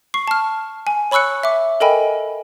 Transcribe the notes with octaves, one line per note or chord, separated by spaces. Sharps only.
C#6 C7
A5 F6
G#5
C#5 B5 C#6 E6 F#6 C#7
E5 D6
A4 A#4 D#5 G5 G#5 B5